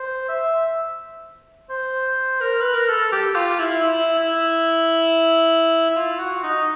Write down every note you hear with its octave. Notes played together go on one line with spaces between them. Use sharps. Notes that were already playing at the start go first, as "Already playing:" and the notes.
Already playing: C5
E5
C5
A#4
B4
A#4
A4
G4
F4
E4
E4
E4
E4
F4
F#4
D#4